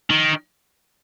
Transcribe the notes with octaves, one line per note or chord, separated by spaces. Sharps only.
D#3